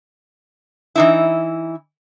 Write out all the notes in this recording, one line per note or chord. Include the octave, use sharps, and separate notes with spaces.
E3 D#4 E4